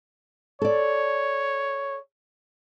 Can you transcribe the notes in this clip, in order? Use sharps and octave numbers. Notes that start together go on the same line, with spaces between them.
A4 C#5 D5